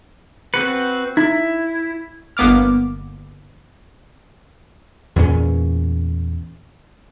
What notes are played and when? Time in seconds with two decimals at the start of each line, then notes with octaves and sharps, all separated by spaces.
0.54 C4 F#4 B4 C#7
1.17 D#4 E4
2.37 G1 A#3 B3 D6 F6
5.16 E2 A#2 C#4